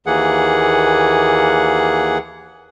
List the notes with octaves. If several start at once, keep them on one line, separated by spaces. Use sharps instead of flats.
D#2 E3 A#3 G#4 F#5